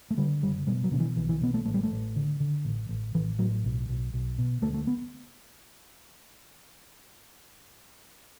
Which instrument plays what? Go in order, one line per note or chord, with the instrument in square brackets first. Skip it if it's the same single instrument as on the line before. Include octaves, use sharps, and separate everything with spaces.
[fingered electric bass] A3
D3 G3
F#1 G3
B2 G3
F#3
B2 D3
E3
B1 E3
E3
B2 B3
A3
A1 A3
G3
A3
A1
D3
D3
A1
A1
A1 E3
A2 F#3
B1
B1
B1
B2
D2 A3
A3
B3